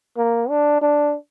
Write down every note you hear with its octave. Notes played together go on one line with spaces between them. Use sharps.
A#3
D4
D4